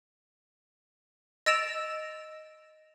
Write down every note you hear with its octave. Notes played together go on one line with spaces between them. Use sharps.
D#5 E6 A6 D7 E7 F7